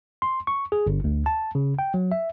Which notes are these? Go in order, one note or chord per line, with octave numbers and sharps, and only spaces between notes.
C6
C#6
G#4
G1
D2
A5
C#3
G5
F#3
E5